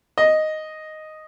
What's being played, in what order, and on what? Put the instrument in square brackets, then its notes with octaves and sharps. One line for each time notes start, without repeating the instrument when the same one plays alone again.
[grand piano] D#5